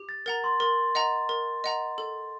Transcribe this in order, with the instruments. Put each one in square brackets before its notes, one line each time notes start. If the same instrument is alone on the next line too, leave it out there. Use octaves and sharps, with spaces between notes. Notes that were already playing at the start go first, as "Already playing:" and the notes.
Already playing: [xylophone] G4
[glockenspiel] A6
[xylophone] A#4 F#5 A#5 [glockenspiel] A6
[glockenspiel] C6
[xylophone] A#4 [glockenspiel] C6
[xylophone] D#5 F#5 A#5
A#4
D#5 F#5 A#5
A4